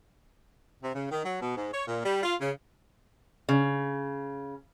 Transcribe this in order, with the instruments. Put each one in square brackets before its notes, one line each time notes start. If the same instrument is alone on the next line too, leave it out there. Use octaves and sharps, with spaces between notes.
[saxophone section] C3
C#3
D#3
F#3
B2
G#2
C#5
A#2
G3
F4
C#3
[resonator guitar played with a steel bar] C#3